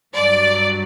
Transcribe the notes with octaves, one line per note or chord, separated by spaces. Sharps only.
G2 F#3 D5